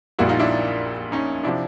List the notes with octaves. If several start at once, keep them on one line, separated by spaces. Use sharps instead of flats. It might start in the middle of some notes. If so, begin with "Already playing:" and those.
A#1 A#2 G3 A#3 E4 F#4
D#4 F4
D4 E4
C#4 D#4
C3 F3 D4 E4